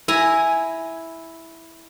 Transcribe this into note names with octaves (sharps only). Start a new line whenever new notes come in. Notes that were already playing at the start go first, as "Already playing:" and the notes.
E4 G#5 A#5